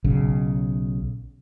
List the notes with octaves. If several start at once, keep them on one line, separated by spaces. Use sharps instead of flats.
B1 C#3